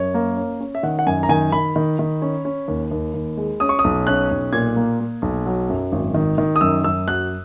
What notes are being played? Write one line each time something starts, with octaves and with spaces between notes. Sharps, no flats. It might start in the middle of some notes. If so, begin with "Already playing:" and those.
Already playing: F#2 C#5
A#3
C#4
C#4
E5
D#3 F#5
F#5
F#2 G#5
A#5
D#3 G#5
D#3 B5
D#3
D#3
C#4
C#4
D#2
D#2
D#2
G#3
C#4 D#6
C#6
D#6
B1
C#4 F#6
B1
A#2 G#6
A#3
A#3
B1
F#3
F#2
G#1
D#3
D#3
D#6
F#2 E6
F#2 E6
F#3 F#6